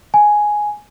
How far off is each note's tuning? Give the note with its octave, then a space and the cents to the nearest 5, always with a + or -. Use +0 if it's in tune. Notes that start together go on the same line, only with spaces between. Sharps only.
G#5 +5